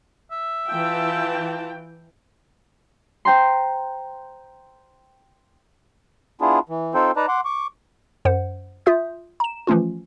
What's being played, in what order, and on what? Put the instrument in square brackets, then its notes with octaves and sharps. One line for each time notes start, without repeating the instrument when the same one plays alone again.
[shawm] E5
[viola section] E3 G5 [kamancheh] F4 A5
[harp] C5 G5 A#5 C6
[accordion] B3 D4 E4 F4 G#4
E3
C4 D#4 F4 A4 C5 G5
D#4 B4 D5 A5 A#5
F#5 C6 D6
C#6 D6
[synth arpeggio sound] F#2 C5 F#5
F4 E5 D#6 G6
A#5 E7
E3 F3 A3 C#4 F4